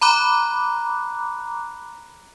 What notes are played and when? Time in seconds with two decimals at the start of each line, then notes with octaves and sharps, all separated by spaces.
0.01 A#5 B5 D6 F#6